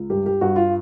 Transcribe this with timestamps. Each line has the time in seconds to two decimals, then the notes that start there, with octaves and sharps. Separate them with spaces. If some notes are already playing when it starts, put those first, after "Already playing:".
Already playing: C#2
0.10 G2 G4
0.26 G4
0.41 G2 F#4
0.56 F4